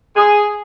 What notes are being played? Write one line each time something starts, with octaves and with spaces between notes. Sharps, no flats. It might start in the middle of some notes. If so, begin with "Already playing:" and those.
G#4